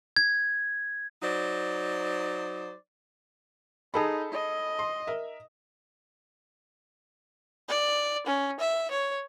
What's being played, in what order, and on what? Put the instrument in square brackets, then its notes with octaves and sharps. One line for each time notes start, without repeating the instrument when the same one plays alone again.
[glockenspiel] G#6
[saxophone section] F#3 D#4 C5 D5
[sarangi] D#4 [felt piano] G#4 A4 B5
[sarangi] D#5
[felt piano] C6
A#4 E5
[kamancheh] D5
C#4
E5
C#5